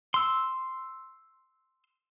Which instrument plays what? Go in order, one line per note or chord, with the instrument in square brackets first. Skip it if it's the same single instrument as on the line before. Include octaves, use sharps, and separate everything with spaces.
[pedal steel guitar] C6 E6